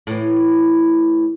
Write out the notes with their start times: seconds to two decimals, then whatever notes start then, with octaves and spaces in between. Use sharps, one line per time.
0.07 A2 E3